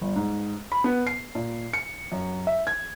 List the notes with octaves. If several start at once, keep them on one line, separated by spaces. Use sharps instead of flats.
G1
G#2
B5
B3
C7
A#2
C#7
F#2
E5
G#6